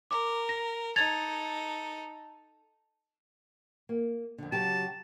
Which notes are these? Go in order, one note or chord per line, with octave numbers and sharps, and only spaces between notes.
A#4 D6
A#6
D#4 A4 G#6 A6 F7
A#3
F2 D3
C#3 F#3 G4 A5